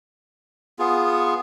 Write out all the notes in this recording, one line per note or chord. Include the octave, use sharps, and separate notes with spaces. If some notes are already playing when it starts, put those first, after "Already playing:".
B3 F4 G#4